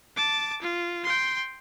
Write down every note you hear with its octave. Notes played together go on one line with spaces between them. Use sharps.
A5 D6
F4
G5 C6